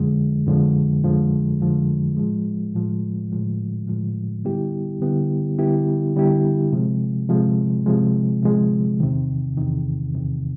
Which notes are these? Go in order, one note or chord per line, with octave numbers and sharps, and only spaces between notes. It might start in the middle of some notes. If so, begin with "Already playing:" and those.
Already playing: F2 D3 F3 G#3
F2 D3 F3 G#3
F2 D3 F3 G#3
F2 D3 F3 G#3
A2 F3 G#3
A2 F3 G#3
A2 F3 G#3
A2 F3 G#3
D3 G3 B3 E4 G4
D3 G3 B3 E4 G4
D3 G3 B3 E4 G4
D3 G3 B3 E4 G4
C3 F3 G#3
C3 F3 G#3
C3 F3 G#3
C3 F3 G#3
E2 C3 D#3
E2 C3 D#3
E2 C3 D#3